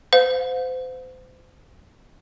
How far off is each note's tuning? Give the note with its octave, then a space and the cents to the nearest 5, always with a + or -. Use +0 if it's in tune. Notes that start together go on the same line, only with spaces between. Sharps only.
C5 -35 F5 +45